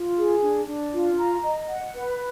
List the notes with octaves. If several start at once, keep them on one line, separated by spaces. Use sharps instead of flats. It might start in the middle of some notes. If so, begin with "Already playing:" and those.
Already playing: F4
G#4
D4
D4
F4
A#5
D#5
F#5
B4